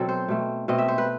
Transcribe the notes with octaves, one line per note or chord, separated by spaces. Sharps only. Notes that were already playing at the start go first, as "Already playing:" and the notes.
Already playing: B2 F#3 C4 A4
C5
B2 A3 C4
B2 A3 C4 D#5
E5
C5
B4